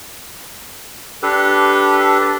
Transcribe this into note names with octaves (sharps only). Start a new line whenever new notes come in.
D4 G4 A4 B4
A5